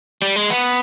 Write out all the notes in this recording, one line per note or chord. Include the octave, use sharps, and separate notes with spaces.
G3
G#3
B3